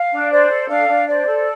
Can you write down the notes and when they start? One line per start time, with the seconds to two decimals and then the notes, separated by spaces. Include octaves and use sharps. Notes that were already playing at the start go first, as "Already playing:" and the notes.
Already playing: F5
0.12 D4
0.31 C5 D5
0.50 A4
0.69 D4 F5
0.88 D4
1.06 C5 D5
1.26 A4